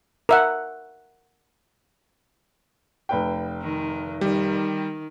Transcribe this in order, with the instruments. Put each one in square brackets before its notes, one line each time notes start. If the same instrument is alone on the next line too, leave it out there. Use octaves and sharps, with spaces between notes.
[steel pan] A#4 E5 F#5
[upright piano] F1 B4 G5
[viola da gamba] D#3
[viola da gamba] D#3 [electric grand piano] G3